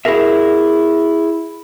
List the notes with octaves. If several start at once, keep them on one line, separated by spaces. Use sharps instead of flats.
E4 F#4 G#4 A#4 E5